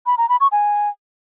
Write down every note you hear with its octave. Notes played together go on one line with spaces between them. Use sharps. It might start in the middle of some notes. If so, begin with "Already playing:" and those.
B5
A#5
B5
C#6
G#5